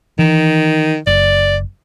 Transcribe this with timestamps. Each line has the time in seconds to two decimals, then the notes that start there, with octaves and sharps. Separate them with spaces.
0.19 D#3 E3
1.07 F#1 D5